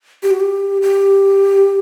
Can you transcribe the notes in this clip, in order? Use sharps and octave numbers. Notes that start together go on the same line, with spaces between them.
G4
F#4
G4
G4